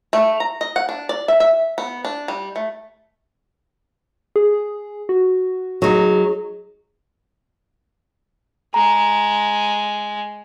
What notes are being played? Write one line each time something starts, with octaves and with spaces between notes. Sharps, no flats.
A3
A#5
D#5
F#5
D4
D5
E5
E5
B3
D4
G3
A3
G#4
F#4
F#3 D#4 G#4
G#3 A#5